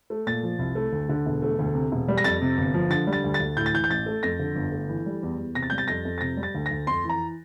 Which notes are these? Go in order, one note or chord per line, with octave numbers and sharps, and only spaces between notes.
A3
A#2 A6
F3
C2
A3
D2
D3
E1
A3
D2
C3
E1
G3
A#6
F2 A6
C3
G1
F3
D3 A6
G3
A6
D2
A6
D2
A2 G6
A6
E3 G6
G6
A1 A6
A3
F2 A#6
D3
G1
A3
E3
G3
E2
E2
C3 A#6
A6
G3 G6
A6
F2 A#6
F2
A6
C3 A#6
G3
A6
D2
A#6
D2
F2 C6
E3
A#5